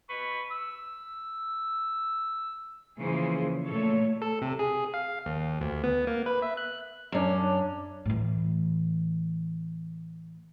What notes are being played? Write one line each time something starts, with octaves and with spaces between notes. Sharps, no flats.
B4 C#6
E6
C#3 E3 F3 A#3 G#4 C5
A#2 A3 A4 C#5
A4
C3
G#4
F5
D#2
D2
B3
A#3
B4
E5
F#6
F#2 C#4 D4
A2 E3